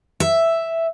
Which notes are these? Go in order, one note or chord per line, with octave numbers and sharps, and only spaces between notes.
E5